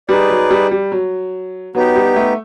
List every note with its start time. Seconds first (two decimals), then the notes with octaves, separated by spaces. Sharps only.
0.09 G3 D#4 G#4 B4 D5
0.30 F#3
0.50 G3
0.71 G3
0.92 F#3
1.75 F#3 B3 D#4 G4
1.96 G3
2.16 A3